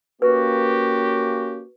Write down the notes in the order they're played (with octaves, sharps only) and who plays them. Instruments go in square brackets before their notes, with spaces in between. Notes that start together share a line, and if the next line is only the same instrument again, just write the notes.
[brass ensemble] A#3 C#4 G4 [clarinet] F#4 [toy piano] B4